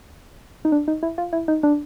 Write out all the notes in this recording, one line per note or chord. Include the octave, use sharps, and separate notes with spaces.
D#4
D4
D#4
E4
F4
E4
D#4
D4